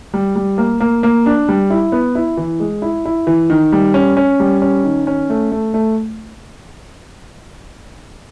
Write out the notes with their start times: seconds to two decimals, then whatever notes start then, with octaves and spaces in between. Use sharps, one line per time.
0.14 G3
0.36 G3
0.58 A#3
0.81 A#3
1.03 A#3
1.26 D4
1.49 G3
1.70 E4
1.92 B3
2.15 E4
2.37 E3
2.60 G#3
2.82 E4
3.06 E4
3.27 E3
3.50 D#3
3.72 G3
3.94 C#4
4.17 C#4
4.40 G3
4.62 C#4
4.84 D#3
5.07 C#4
5.30 A3
5.52 A3
5.74 A3